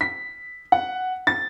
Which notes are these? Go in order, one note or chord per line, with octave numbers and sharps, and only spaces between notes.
B6
F#5
A6